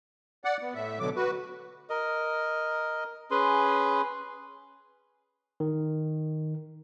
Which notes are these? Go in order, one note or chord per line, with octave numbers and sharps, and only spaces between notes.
D5 F#5
B3
A2 E5
B2 D3 F#3 D6
F#4 B4
A#4 D#5
C#4 G#4 B4 C6
D#3